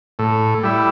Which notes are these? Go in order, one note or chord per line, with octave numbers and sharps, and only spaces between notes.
A2
G3 E4